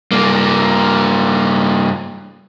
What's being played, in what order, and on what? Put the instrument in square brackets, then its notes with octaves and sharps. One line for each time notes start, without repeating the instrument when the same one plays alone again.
[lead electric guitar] G2 A#3